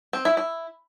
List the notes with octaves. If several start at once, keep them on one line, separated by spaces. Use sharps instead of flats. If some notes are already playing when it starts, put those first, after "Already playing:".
C4
E4
E4